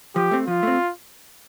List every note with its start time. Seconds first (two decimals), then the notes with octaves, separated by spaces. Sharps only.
0.16 F3 G4
0.31 A3 C4
0.47 F3 F4
0.63 A3 C4